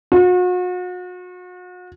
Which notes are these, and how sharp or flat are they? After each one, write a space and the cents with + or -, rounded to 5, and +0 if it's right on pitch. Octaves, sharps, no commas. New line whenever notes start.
F#4 -40